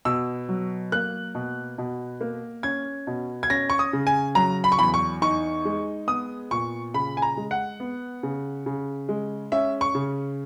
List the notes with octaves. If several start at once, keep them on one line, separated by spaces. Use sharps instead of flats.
B2 E6
F#3
A#3 F#6
B2
B2
A#3
C#4 G#6
B2
G#6
C#4 A#6
C#6
D#6
C#3
G#5
F#3 A#5
B5
C#6
E2 B5
C#6
D#4 C#6
G#3
B3 D#6
A#2 C#6
C#3 B5
G#5
A#5
G#3
F#5
B3
C#3
C#3
G#3
C#4 E5
C#6
C#3